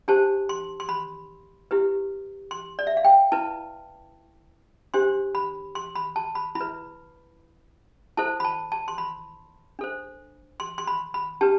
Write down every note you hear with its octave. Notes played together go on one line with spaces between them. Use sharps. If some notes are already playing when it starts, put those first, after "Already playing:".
D4 G4 C5 A5
C6
C6
B5
E4 G4 B4
C6
D5
E5
F5
G5
E4 B4 A5
D4 G4 C5 C6
B5
C6
B5
A5
B5
E4 B5
B4
E4 A4 C5 A5
B5
A5
A5
C6
B5
D4 A4 C5
C6
C6
B5
B5
D4 G4 B4 A5